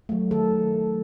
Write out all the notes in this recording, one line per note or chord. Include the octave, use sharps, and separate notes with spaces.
F#3 A3
D#3 A4